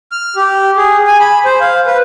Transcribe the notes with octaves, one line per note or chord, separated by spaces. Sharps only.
F6
G4
G#4
G#5
B5
C5
F5
B4